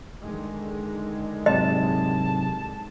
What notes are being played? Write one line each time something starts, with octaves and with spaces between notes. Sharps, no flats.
D3 D#3 G#3
G#2 C3 F#3 D#5 A5